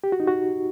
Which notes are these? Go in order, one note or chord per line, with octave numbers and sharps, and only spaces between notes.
G4
F#4
D#4
F#4